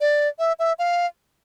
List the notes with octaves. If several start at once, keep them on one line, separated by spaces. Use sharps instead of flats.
D5
E5
E5
F5